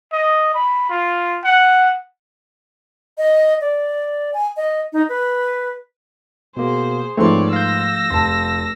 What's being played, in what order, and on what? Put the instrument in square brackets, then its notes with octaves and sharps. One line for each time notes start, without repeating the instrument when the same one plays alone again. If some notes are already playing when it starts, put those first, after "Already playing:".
[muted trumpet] D#5
B5
F4
F#5
[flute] D#5
D5
G#5
D#5
D#4
B4
[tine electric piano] B2 A#3 [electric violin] G#4 C5
[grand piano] G#2 B4 C6 [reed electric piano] F3 A3 [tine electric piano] C4 [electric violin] C#5 D5
[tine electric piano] F5 G6 [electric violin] E6 A#6
[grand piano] F1 A5 [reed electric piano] C6